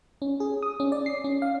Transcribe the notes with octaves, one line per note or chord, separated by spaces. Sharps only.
C#4
G#4
D#6
C#4
D5
C7
C#4
F5